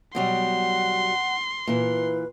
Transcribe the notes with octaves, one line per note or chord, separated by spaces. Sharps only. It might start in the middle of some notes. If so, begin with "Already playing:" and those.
B2 F#3 G3 F#5 C6
A#2 E3 B4